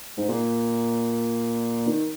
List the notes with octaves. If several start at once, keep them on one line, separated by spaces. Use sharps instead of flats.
G#2
A#2
D#3